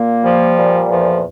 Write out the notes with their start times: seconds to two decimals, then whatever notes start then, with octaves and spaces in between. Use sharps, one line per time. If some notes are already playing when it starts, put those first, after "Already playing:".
Already playing: A#2 A#3
0.24 F3 G3
0.57 A#2
0.90 E2 F3